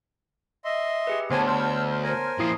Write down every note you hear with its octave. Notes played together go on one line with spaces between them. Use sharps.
D#5 E5 C6
G4 G#4 B4
D2 B3 C5 C#5 G#5 A5
C6 E6 F6 G6
A#4 C5 G#5
A#2 F3 E4 D#6 C7